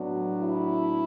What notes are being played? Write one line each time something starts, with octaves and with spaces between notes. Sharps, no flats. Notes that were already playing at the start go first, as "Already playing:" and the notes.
Already playing: A2 F#3 B3 D4 F#4
E4